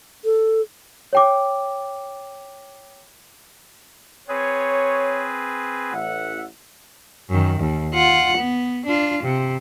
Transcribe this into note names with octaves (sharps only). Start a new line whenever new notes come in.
A4
C#5 G5 D6
C4 G#4 B4 C#5
A1 E5 F#5
F#2 D#3
D#2
F4 F#5
B3
D4 F4
C3